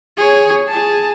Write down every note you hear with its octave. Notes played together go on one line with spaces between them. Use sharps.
G#4 C#5
G#4 A5